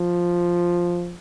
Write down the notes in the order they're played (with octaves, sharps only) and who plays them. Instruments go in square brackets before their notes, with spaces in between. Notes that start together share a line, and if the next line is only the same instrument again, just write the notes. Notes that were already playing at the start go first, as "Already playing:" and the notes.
Already playing: [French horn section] F3